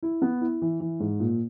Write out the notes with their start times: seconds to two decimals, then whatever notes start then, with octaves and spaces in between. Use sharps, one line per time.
0.03 E4
0.22 B3
0.41 E4
0.62 E3
0.80 E3
1.00 G#2
1.20 A#2